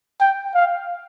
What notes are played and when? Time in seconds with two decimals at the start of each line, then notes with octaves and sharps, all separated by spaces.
0.21 G5
0.55 F5